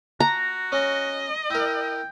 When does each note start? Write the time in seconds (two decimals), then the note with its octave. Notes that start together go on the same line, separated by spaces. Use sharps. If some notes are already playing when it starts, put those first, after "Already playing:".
0.20 F#4 A#5
0.72 C#4 D#5
1.50 E4 A#4 G5